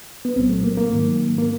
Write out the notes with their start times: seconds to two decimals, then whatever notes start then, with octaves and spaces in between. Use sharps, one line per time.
0.25 B3
0.36 C2 A#2 F#3 C4
0.50 A3
0.64 A#3
0.77 A#3
0.91 G#2 D#3 F#3
1.38 A#3